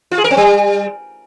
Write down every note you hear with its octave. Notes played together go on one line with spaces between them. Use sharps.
F4
G#4
A#4
C4
G3